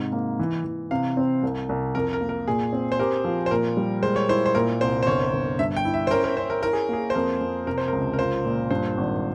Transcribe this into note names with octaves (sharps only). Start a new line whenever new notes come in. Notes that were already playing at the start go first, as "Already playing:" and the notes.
Already playing: G#2 C3
A#3
E3
E3
C3 F5
C4
C2
C2
F2 A#4
A#4
A#3
A#4
A#2 G#4
C4
C5
G4 A#4
F3
C5
A#2 A#4
G3
G#3 C5
C#5
E4 C5
C5
A#2 A#4
C2 C5
C5
G1 C#5
G1
G2 E5
G5
E4
E5
C5
C#4 A#4
A#4
C#4 C5
A#4
E4 A#4
G#4
A#3 G#4
C5
F2 A#4
F2
C3 A#4
C5
A#4
C#2
A#4
F4 C5
A#2
G2 C5
G#1